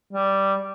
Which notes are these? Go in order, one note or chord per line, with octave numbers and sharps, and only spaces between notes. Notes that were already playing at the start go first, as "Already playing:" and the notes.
G3